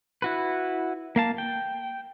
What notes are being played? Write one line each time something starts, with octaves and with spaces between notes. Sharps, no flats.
E4 F#4 B4
A#3 F5 A5
G5